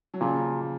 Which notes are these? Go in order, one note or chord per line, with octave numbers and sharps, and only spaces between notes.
F#3
A#2 C#3 F3